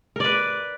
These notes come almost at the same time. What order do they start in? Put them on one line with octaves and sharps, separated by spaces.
A#4 D5 B4